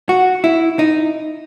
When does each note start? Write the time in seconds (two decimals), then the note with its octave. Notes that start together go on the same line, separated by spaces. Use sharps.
0.09 F#4
0.44 E4
0.79 D#4